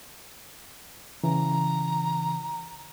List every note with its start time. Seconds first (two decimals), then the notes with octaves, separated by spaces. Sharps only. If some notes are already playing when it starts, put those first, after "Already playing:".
1.23 C#3 E3 A#5